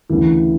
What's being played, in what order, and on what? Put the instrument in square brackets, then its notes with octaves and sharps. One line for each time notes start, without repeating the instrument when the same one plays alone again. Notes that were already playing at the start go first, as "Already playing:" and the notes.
[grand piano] D2 C#3 E3 E4